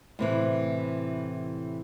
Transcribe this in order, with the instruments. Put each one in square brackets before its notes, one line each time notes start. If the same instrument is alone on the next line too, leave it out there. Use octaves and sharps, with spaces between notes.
[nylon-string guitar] A2 C3 E3